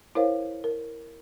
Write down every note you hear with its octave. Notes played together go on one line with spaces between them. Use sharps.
E4 A#4 C5 C#5 F5
A#4